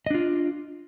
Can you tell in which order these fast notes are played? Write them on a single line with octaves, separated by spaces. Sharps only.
D#5 D4 F4